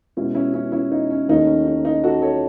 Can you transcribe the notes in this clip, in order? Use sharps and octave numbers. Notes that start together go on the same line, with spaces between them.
B2 G#3 C#4 E4
C#4 E4
C#4 E4
C#4 E4
D#4
C#4
D#2 D#3 A3 C#4 D#4
C#4
D#4
D#4
F#4 A4
A4 C#5